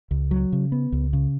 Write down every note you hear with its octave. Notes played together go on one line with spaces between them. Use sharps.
C#2
F#3
C#3
B3
C#2
C#3